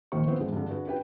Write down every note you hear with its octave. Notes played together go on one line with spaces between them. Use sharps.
A#1 D#2 D#3 A#3 C5 C#6
B3 C#4 E4 F4 B4 C5
G#2 D3 E3 G#3 C#4
G2 D3
D4 F#4 G#4 B4
C#4 G4 B4 G5